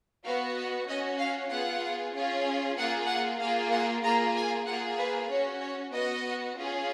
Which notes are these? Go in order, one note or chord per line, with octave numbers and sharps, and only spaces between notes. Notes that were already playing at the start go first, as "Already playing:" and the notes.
B3 F#4 F5
D#5
C#4 F#4 D#5
F5
B3 F4 G#4 F#5
C#4 F4 G#4
A#3 F4 G#4 F#5
F#5
A#3 F4 G#4 F5
F#5
A#3 F4 G#4 A#5
G#5
A#3 F4 G#4 F#5
B4
C#4 F#4 C#5
C#5
B3 F#4 D#5
C#4 F4 G#4